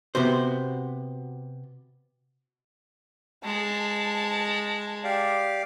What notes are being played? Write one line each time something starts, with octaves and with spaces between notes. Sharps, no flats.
C3 B3 F#4 C5
G#3 A5
G4 D5 F5